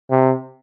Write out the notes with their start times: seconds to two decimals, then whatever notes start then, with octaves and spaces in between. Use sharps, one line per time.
0.10 C3